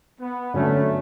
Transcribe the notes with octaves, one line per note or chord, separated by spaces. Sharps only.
B3
D3 F#3 A3 C#4